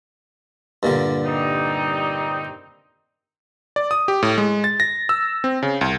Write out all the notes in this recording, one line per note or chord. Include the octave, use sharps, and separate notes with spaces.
G2 A#2 D3
G3 C4 D#4
D5
D#6
G4
A2
G#3
A6
A#6
E6
C4
C#3
C2